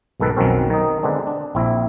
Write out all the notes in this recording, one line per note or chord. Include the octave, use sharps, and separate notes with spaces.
B1 G#2 D#3 A4 B4
B1 F2 D#3 F#3 C4 C#4
D#3 D#4
D3 G#3 B3 C4 D4
D4
A#1 C4 E4